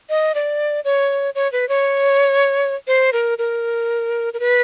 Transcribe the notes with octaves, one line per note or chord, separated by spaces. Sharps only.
D#5
D5
C#5
C#5
B4
C#5
C5
A#4
A#4
A#4
B4